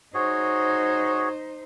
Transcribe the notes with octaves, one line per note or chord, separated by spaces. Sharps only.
D#4 F#4 G#4 C5 C#5